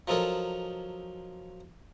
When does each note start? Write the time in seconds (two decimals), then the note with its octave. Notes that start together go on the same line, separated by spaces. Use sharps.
0.08 F3 F#3 D#4 A4 A#4 C#5